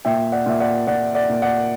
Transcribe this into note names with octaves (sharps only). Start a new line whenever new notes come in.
A#2 E5 G5
D5 F#5
A#2 E5
D5 F#5
A#2 D5 F#5
D5 F#5
A#2
D5 F#5